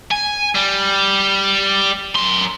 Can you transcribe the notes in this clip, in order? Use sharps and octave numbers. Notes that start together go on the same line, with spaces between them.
G#5
G3
F#2 C6